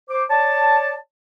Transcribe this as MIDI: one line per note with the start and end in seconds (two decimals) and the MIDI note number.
0.09 0.24 72
0.09 0.24 86
0.30 0.95 73
0.30 0.95 74
0.30 0.95 81